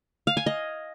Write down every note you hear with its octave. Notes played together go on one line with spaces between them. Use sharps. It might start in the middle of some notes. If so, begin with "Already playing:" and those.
F5
G#5
D#5